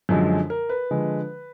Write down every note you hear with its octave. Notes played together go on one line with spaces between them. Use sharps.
F#2 D3 F3 G#3
A#4
B4
D3 F3 G#3